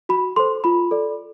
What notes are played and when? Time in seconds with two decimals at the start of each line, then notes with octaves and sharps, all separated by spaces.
0.09 F#4 B5
0.36 A4 C5 C6
0.64 F4 B5
0.91 A4 D5